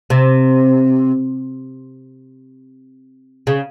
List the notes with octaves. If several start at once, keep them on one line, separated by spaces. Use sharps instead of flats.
C3
C#3